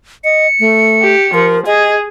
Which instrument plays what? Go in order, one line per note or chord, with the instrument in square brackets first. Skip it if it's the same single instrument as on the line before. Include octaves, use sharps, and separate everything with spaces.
[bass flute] D#5 [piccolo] C#7
[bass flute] A3
[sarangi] G4
[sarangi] F3 [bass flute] A#4
[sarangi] G#4 [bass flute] D#5